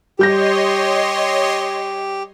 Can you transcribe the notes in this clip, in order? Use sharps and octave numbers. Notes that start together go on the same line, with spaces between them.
G3 G4 C#5 D#5 C6 G6 A#6